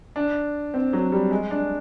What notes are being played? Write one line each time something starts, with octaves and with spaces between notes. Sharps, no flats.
D4
C4
F#3
G3
G#3
D4